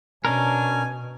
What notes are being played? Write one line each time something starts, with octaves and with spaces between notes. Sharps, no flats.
B2 C#4 D4 A#4 G#5